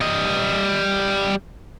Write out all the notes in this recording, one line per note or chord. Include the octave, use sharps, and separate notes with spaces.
G3 D#5